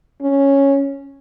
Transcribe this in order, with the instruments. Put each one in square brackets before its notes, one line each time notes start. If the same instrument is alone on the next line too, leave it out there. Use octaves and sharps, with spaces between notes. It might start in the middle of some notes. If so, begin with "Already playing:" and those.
[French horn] C#4